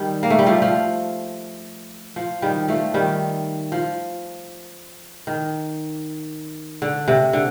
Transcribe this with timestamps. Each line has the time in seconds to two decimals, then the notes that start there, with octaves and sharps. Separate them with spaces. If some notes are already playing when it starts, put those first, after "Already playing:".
Already playing: D#3 G3
0.23 A#3
0.30 A3
0.39 G3
0.46 F3 A3
0.62 F3
2.16 F3
2.42 D#3 G3
2.68 F3 A3
2.94 D#3 G3
3.72 F3
5.27 D#3
6.82 D3
7.08 C3
7.33 D3